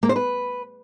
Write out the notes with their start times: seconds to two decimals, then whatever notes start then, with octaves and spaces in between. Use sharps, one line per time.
0.03 A#3
0.09 C5
0.16 B4